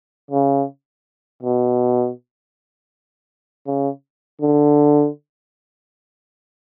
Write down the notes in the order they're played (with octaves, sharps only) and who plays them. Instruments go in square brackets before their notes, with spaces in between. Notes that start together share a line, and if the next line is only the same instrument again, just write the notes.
[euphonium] C#3
B2
C#3
D3